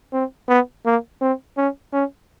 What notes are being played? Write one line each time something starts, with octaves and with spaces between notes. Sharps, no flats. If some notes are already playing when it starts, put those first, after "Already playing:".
C4
B3
A#3
C4
C#4
C#4